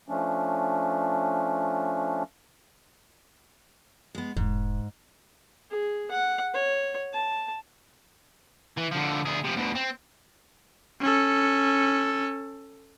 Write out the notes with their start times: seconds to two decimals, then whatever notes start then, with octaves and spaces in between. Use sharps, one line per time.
0.09 F3 A3 C#4 D4
4.15 G#3 B3
4.37 E1 G#2
5.71 G#4
6.11 F#5
6.54 C#5
7.13 A5
8.78 E3
8.92 D3 F3
9.26 D2 G#4
9.45 C3 F3
9.56 D2 B2
9.75 C4
11.01 C#4 A4